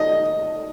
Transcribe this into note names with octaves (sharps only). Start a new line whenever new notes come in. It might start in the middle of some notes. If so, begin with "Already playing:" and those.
Already playing: D#3 D#5